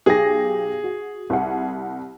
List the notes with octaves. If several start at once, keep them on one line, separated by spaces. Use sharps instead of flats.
B1 G4 G#4 A#6
F#4
C2 F#5